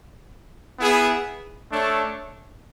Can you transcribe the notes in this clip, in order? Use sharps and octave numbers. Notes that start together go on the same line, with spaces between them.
B3 E4 G#4
A3 D4 A4 C#5